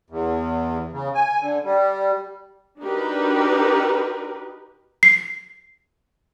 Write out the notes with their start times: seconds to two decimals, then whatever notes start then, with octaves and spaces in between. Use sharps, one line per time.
0.10 E2
0.93 C#3
1.15 G#5
1.41 D3
1.64 G3
2.82 D4 D#4 F#4 G4 A#4 B4
5.03 C7